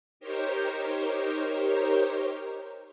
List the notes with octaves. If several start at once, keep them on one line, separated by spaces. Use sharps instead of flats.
D#4 G4 A#4 C5 C#5